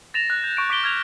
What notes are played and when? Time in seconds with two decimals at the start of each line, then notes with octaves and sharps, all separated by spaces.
0.14 A6 A#6 E7 F7
0.30 F#6
0.44 G6
0.57 C#6 D7
0.70 D6 B6 D7 G7
0.83 F6 G#6 F7